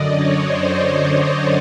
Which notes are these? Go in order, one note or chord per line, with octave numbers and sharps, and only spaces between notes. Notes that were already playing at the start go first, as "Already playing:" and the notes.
Already playing: F#2 D3 D5 D#5
C#5
C5
C#5